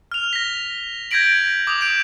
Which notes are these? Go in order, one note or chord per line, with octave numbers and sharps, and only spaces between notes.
F6 F7
A#6 B6
G6 G#6 A#6 B6 D7 F#7
D6 D#6 F7
G6 D7